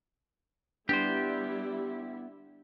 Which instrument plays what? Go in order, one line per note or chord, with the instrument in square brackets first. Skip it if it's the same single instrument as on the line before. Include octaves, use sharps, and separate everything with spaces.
[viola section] G3 E4 [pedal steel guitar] B3 [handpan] D4 [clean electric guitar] G4 C5